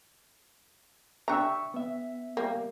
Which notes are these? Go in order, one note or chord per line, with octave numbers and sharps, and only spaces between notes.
D4 G4 E5 A#5 C#6 E6
B3 E5
G3 A#3